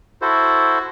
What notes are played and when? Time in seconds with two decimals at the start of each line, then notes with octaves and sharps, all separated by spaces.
0.22 E4 F#4 A4 C5